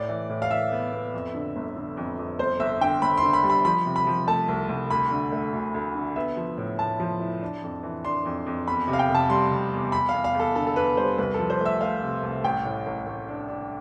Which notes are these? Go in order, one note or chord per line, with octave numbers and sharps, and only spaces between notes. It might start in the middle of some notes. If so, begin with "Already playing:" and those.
Already playing: A2 D5
E3
A2
F5
E3 E5
B3
B3
F2
D3
G1
D3
F2
F2
G1 C5
G1 E5
D3 G5
G1 B5
C6
D3
B5
G3
B5
F3 B5
C3
B5
F3
A3 A5
C2
C2
D2 B5
D3
A3
D2
D2
D3
B3 E5
F3
A2
A2 A5
F3
E4
D4
F2
E3
D4 C6
F2
F2
E2 B5
C3
F5
G5
F1
A5
G3 C6
F1
E2
E2 B5
E2 F5
F5
E2
A4
D3 A4
A4
E2 B4
G3 C5
C2 B4
F3 A4
C5
A3 E5
A3 F5
C3
C2
A1 G5
A2
A1
A1
D4
D4